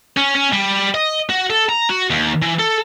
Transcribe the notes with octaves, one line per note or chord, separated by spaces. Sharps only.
C#4
C#4
G3
D#5
F#4
A4
A#5
F#4
D#2
E3
A4